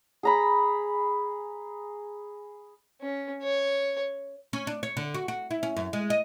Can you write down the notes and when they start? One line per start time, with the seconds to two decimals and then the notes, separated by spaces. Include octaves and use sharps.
0.23 G#4 A#5 B5
3.01 C#4
3.43 C#5
4.53 C#4
4.67 D4
4.83 C#5
4.97 D3
5.14 F#4
5.28 F#4
5.51 E4
5.63 C#4
5.77 F#2
5.93 G#3
6.10 D#5